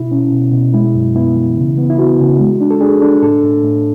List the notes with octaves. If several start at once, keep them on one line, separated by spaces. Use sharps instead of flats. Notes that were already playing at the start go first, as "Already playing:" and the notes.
Already playing: B2 E4
C#4
B2
B2
G#3 E4
F#2
B3 E4
E3
C#3
B3
E4
B3 F#4
C#3
G#3
D4
A4
D4 G#4
D4 A4
A2 A4
A2
A2